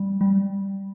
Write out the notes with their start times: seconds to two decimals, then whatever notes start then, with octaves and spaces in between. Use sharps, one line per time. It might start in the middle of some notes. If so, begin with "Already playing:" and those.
Already playing: G3
0.21 G3